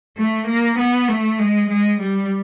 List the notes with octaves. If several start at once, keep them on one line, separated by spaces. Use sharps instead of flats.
A3
A#3
B3
A3
G#3
G#3
G3